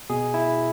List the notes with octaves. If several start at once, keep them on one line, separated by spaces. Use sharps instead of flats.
B2 G#4
E4